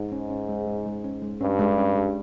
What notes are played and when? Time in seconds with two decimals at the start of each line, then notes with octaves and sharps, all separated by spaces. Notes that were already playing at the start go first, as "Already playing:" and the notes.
Already playing: G#2
0.12 C#4
0.30 C#4
0.49 G#3
0.67 G#3
0.86 G#3
1.04 C#4
1.22 G#3
1.41 G2 C#4
1.59 G#3
1.78 C#4
1.96 G#3